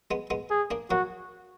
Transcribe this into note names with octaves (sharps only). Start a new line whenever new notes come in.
G#3 B3
G#3 B3
G#4
A#3 D4
F#3 A#3 F#4